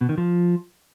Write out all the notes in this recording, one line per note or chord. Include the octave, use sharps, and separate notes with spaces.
B2
D#3
F3